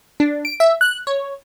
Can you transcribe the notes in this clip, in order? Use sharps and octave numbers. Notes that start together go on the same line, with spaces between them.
D4
D7
E5
F#6
C#5